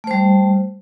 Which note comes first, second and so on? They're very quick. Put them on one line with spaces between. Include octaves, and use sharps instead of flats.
A3 C5 G3